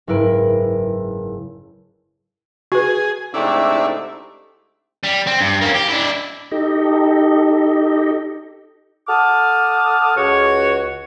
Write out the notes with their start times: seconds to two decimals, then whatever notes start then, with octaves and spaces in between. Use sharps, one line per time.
0.07 F#1 G#2 E4 A#4 B4 D7
2.72 F#4 G#4 B4
3.34 G#2 C3 A3 D4 E4
5.03 G3
5.27 C4
5.41 G2
5.61 A#3 C#4
5.75 G4
5.89 D4 E4
6.51 D#4 G4 A4 D#5
9.08 A4 F#5 A5 D6 D#6 F6
10.16 C#2 F#4 C#5